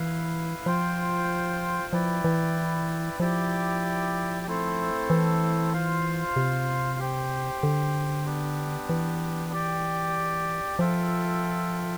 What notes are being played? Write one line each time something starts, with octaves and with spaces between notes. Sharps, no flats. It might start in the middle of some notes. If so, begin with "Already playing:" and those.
Already playing: E3 E4 B4 F5
F3 F4 C5 G5
F3 E4 B4 D5 G5
E3
F3 E4 G4 D5 G5
A3 C4 E4 A4 C5
E3
F4 C5 F5
C3
G4 C5 G5
D3
B3 D4 G4
E3
G4 D5 G5
F3 F4 A4 E5 G5